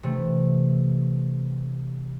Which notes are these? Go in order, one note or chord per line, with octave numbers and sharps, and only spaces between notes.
C3 E3 A3